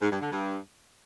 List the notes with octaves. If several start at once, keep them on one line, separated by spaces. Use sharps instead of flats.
G#2
G2
D3
G2